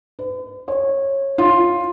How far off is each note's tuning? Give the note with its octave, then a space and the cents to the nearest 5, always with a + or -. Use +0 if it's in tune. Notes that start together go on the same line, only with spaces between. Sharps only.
B4 +45
C#5 -20
F4 +5